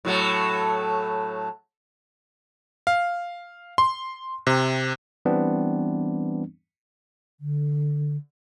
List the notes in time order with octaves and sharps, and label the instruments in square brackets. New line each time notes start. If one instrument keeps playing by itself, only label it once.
[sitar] A2 F#3 A3
[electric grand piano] F5
C6
C3
[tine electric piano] E3 G3 B3 C4 D4
[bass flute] D3